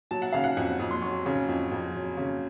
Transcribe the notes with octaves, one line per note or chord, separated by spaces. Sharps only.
F#3 A5
F#5
C#3 F5
F#5
F2 F#5
F2
C6
F#3 C#6
C#3
F2
F2
F#3
C#3